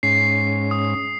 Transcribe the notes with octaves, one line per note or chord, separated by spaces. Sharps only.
G#2 C#4 C7
D#6